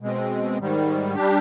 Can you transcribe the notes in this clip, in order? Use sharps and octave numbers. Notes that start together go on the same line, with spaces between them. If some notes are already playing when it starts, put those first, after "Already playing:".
B2 G#3 C4
G#2 D#3 G3
G3 D4 G4